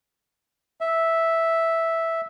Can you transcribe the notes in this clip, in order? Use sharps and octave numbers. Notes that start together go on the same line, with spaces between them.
E5